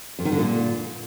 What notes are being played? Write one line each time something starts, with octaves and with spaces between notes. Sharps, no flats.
F2
D#3
D3
A#2